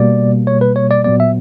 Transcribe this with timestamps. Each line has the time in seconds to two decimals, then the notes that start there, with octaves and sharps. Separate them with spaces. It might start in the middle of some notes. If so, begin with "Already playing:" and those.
Already playing: B2 G3 A#3 D5
0.47 C#5
0.61 B4
0.76 C#5
0.91 D5
1.04 A#2 F#3 B3 D5
1.20 E5